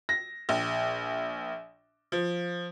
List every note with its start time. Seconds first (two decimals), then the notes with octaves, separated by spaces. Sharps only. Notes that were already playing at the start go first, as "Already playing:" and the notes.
0.09 A#6
0.49 A#1
2.12 F3